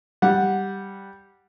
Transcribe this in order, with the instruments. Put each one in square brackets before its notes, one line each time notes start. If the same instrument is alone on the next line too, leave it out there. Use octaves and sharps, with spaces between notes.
[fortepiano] G3 F#5